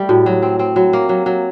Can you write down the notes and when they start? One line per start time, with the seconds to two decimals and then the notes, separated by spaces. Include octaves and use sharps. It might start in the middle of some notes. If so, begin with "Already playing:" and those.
Already playing: G3 A3
0.09 A2 F#4
0.26 F#3
0.42 C4
0.59 C4
0.76 F#3 F#4
0.93 A#3
1.09 F#3
1.26 F#3